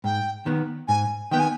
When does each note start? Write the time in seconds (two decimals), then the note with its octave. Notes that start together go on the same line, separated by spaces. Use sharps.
0.04 G#2 G5
0.46 D#3 B3
0.88 G#2 G#5
1.31 D#3 B3 G5
1.40 G#5